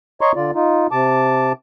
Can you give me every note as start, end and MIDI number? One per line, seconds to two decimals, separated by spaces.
0.21 0.32 73
0.21 0.32 75
0.21 0.32 82
0.21 0.32 84
0.21 0.32 85
0.36 0.51 50
0.36 0.51 65
0.36 0.51 74
0.55 0.87 63
0.55 0.87 65
0.91 1.52 48
0.91 1.52 81
0.91 1.52 86